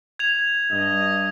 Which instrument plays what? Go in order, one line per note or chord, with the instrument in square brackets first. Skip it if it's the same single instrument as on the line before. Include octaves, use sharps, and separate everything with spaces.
[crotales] G#6 F7
[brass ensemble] G2 D#5